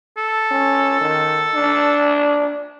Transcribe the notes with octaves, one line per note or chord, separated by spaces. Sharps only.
A4
C#4
D#3
D4